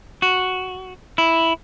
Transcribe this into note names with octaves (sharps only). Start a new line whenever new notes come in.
F#4
E4